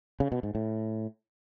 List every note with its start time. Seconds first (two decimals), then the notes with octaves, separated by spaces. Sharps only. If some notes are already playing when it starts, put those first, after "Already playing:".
0.20 C#3
0.32 B2
0.43 G#2
0.55 A2